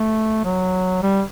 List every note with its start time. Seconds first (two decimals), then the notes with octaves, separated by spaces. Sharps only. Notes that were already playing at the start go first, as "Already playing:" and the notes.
Already playing: A3
0.45 F#3
1.03 G3